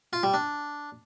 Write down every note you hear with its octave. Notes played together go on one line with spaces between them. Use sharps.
F4
G3
D4